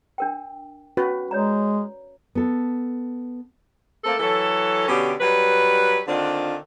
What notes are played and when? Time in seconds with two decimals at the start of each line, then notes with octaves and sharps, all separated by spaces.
0.18 D4 A#4 G5
0.97 C#4 F#4 B4
1.31 G#3 C#5 D5 A#5
2.35 B3 A4
4.05 A3 A#3 C4 A4
4.19 E3 F#3 A4
4.88 B2 D3 C#4 G4
5.20 F#3 G3 B4
6.08 D3 D#3 C4 D4 F4